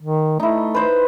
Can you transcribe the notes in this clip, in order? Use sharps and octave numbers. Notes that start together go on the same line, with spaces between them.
D#3
A3 D#4 E4
B4 C5 D#5